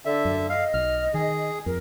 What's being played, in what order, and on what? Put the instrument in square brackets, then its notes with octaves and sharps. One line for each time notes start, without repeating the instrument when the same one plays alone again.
[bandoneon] D3 E5 [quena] D5
[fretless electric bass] F#2
[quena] D#5 [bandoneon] F5
[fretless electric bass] B1 [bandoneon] F6
[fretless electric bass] D#3 [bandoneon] G#4
[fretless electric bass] F2 [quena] A#4